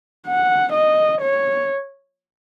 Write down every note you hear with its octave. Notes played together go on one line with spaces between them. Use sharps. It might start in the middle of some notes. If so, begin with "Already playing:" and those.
F#5
D#5
C#5